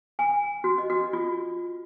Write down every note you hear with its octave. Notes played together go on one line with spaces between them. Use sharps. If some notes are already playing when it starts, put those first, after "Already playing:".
G#5
F#4
D#5
F#4
F4